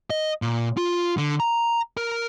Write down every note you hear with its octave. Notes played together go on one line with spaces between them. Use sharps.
D#5
A#2
F4
D3
A#5
A#4